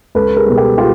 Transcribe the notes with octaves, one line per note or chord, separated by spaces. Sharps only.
C#2 A4 B4
G#4 A#4
B2 G3
G4 A4
F4 G4